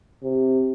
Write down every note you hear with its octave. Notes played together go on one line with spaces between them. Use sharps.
C3